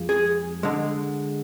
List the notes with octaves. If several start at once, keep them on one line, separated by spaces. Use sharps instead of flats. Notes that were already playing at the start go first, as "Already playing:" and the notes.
Already playing: F2 F3 G#3
G#4
D3 G#3